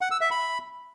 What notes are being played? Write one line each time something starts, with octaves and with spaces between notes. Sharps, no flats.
F#5
E6
E5
B5